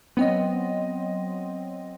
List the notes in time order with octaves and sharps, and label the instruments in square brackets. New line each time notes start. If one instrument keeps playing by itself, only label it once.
[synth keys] F#3 C4 D#5 [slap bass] B3